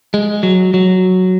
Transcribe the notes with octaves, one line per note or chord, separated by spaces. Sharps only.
G#3
F#3
F#3